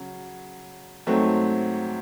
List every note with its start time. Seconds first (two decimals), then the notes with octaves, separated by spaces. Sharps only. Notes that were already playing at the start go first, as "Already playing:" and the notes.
Already playing: C#3 F#3
1.07 G#2 F#3 A3 C4